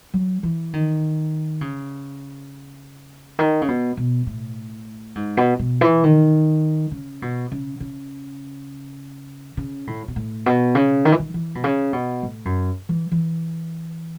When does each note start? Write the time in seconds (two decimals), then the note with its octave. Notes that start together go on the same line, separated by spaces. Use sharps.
0.14 F#3
0.43 E3
0.73 D#3
1.61 C#3
3.39 D#3
3.62 C#3
3.68 B2
3.97 B2
4.27 A2
5.15 G#2
5.37 B2
5.59 B2
5.81 E3
6.04 D#3
6.91 C#3
7.22 B2
7.52 C#3
7.80 C#3
9.57 C#3
9.87 A2
10.08 B2
10.16 A2
10.46 B2
10.75 C#3
11.05 D#3
11.12 E3
11.19 D#3
11.34 E3
11.55 B2
11.64 C#3
11.93 B2
12.23 A2
12.45 F#2
12.89 E3
13.12 E3